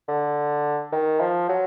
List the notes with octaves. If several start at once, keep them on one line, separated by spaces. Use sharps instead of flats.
D3
D#3
F3
F#3